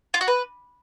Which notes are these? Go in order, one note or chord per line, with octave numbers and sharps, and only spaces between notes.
F4
F#4
B4